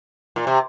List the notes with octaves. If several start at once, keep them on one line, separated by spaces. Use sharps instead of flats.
A#2
C3